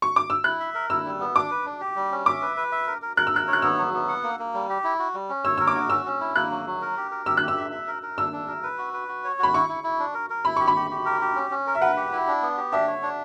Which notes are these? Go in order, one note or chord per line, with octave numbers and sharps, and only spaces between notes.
C#6
D6
E6
E4 F#6
E5
A#4
E4 E6
G3
B3
D4 D6
B4
D4
G4
G3
C#4
E5 D6
B4
B4
E5
A#4
A#4
A#4 F#6
E6
A#4 F#6
C#5
F#6
B3 E6
F#3
B3
F#5
A#3
A#3
G3
G4
E4
F#4
G3
C#4
C#5 E6
A#4 E6
D6
F#4
C#4 E6
C#4
E4
A#3 F#6
F#3
F#3
A#4
G4
A#4
G4 E6
G4 F#6
E6
E5
E5
A#4
A#4
D4 E6
D4
A#4
B4
F#4
B4
F#4
C#5
F#4 B5
E4 C#6
E4
E4
D4
A#4
A#4
E4 B5
G4 C#6
B5
G4
G4
A#4
G4
C#4
C#4
A#4
E5
B4 F#5
G4
E4
D4
B3
G4
D4 E5
C#5
D4